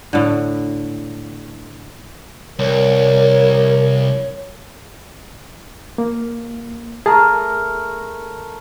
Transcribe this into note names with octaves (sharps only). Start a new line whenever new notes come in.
A2 D3
C2 A#4 C#5
A#3
A3 G#4 A#4 A5